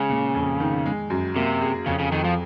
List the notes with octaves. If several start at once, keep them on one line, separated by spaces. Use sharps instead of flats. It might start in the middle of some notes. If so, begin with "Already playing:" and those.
Already playing: C#3 G#3 C#4
A#2
F2
D#3
G#3
F#2
C3 A#3
G#4
F2 C#3
C#3
F2 D#3
F3